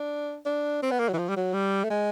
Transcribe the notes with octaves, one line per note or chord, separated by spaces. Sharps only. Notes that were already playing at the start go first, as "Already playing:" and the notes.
Already playing: D4
D4
C4
B3
A#3
F#3
E3
F3
G3
F#3
G3
A3
G#3